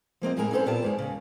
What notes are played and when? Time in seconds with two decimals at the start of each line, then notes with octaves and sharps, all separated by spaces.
0.22 F3 A#3 C4 D#5
0.36 A2 G#3 E4 G#4 A#4 A#5
0.51 A#3 C4 C#4 A4 B4 C5
0.66 A#2 B3 F4 G4 A#4 A5
0.82 E2 G#2 G#3
0.98 D#2 C#3